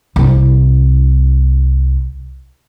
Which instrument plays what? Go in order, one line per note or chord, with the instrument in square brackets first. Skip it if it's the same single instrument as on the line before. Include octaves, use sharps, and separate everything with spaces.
[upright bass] C2 E4